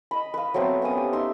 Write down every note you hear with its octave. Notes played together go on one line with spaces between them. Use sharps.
D#5 B5
B4 F5
F#3 A3 B3 C4
B3 C#4 F5 D#6
G4
D#4 E5 C6